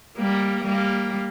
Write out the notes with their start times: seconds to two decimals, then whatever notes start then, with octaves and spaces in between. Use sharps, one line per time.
0.17 G3 A#3
0.64 G3 A#3